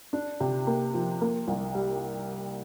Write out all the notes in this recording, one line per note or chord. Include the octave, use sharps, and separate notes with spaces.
D4
C3
A#3
F3
A#3
C2
G3